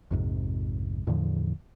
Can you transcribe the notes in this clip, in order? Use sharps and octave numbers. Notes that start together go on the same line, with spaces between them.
A#1 F2 G#2 C3
E2 A2 D3 F3